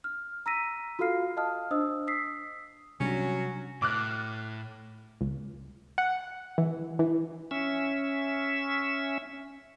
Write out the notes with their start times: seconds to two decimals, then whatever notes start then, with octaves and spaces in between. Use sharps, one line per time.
0.04 F6
0.46 A#5 E6 A#6 B6 D#7
0.99 F4 F#4 A4 F5 F6 C7
1.37 D#5 F5 A5 D#6 F6
1.71 D4 C5 D#5 D#6 E6
2.07 D#6 E6 B6 C7
3.00 C3 F#3 G3 C#4 D4 F#4
3.82 A2 D6 F6 F#6
5.21 C#2
5.98 F#5
6.58 E3
6.99 E3
7.51 C#4 E5